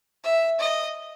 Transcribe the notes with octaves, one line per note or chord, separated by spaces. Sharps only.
E5
D#5